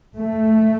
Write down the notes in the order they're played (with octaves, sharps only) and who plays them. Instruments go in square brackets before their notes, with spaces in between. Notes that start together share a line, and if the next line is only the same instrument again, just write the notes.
[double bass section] A3